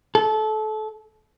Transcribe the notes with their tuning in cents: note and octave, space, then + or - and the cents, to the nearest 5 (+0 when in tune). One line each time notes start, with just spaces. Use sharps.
A4 -25